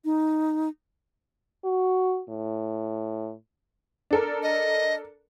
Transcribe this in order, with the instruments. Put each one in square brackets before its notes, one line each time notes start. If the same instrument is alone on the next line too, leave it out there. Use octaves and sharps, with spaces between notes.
[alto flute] D#4
[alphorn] F#4
A2
[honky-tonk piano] D4 A4 A#4
[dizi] D#5